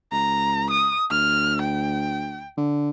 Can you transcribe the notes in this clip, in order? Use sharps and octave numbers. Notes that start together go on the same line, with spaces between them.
C#2 A#5
D#6
D2 F6
G5
D3